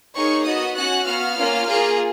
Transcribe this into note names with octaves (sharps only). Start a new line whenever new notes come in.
A#3 D#4 G#4 C#5 C#6
B3 F#4 D#5 D#6
C#4 F#4 F#5 F#6
B3 F#4 F5 F6
A#3 C#4 F4
A#3 F4 G#4